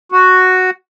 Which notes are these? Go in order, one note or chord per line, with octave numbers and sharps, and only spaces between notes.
F#4